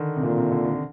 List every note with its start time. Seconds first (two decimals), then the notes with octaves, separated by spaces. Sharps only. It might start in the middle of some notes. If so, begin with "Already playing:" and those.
Already playing: D3 D#3
0.17 C3
0.23 A#2 D3
0.38 C3
0.52 D3
0.65 D3